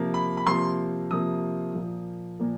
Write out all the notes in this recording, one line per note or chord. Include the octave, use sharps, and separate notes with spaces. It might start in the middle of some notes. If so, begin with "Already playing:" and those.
Already playing: C3 F3 A#3
B5
B5
C3 F3 A#3 C6
C3 F3 A#3 D#6
A#2 F3 A#3
A#2 F3 A#3